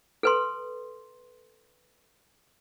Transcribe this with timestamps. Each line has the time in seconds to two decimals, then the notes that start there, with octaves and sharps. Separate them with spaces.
0.23 A4 B4 C6